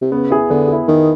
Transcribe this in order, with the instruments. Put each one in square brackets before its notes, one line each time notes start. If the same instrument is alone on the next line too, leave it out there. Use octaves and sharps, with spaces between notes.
[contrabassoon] C3
[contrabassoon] C#3 [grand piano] B3
[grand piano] E4 G#4
[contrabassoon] D3 [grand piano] B3
[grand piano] E4 G#4
[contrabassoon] D#3 [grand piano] B3